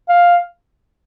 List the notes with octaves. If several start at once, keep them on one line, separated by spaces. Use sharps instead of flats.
F5